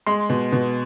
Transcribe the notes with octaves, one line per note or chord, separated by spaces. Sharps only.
G#3 C6
B2
B2